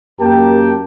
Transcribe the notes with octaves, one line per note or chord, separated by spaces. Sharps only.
F#2 A#3 G4 A#4 G5 A5